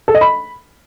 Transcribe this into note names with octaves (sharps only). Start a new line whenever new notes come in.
A4
D#5
B5